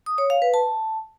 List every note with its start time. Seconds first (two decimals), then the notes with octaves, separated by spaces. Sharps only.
0.06 D#6
0.18 C#5
0.30 F5
0.42 B4
0.54 A5